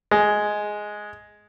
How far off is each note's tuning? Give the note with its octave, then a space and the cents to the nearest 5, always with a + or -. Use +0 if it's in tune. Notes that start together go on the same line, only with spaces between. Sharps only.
G#3 +5